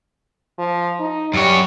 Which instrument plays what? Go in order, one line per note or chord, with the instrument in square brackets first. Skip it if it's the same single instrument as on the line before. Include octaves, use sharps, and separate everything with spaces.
[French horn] F3
D#4
[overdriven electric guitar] F#2 C#5 [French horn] G3